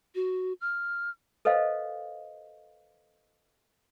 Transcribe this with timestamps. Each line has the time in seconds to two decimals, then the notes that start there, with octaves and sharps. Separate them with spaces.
0.15 F#4
0.61 F6
1.45 A4 B4 C5 D#5 F5